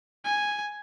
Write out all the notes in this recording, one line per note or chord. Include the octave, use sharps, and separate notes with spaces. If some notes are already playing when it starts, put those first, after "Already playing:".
G#5